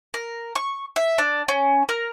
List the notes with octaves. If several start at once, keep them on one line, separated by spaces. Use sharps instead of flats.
A#4
C#6
E5
D4
C#4
A#4